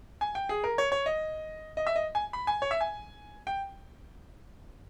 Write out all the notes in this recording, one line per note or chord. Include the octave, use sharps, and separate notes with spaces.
G#5
G5
G#4
A#4
C#5
C#5
D#5
D#5
E5
D#5
G#5
B5
G#5
C#5
E5
G#5
G5